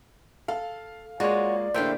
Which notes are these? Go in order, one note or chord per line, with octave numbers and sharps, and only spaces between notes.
A4 F5
G#3 A#3 F4 F#4 C#5 D5
E2 A2 D3 A#3 C5 E5 F5 G5